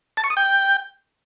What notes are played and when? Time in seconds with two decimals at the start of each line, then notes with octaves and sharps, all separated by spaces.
0.17 A5
0.24 C#6
0.30 D#6
0.37 G5